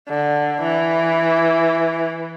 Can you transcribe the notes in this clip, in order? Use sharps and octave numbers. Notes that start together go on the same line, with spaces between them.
D3
E3